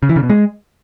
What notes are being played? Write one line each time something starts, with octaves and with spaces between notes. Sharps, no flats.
C#3
E3
C#3
B2
G#3